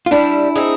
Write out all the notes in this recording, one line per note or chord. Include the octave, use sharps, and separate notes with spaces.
F4
G3 D4 E4
C4 D#4 G#4